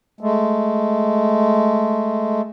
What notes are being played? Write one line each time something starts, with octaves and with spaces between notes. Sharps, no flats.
G#3 A3